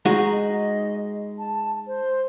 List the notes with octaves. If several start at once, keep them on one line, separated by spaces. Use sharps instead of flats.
G#3 D#4 F#4 A#5
D#5
A5
C5